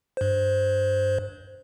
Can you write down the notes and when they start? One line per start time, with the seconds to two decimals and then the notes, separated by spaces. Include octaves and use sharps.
0.17 G2 C5